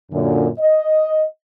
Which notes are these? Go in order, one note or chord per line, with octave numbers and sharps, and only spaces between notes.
F#2 A#2 D3
D#5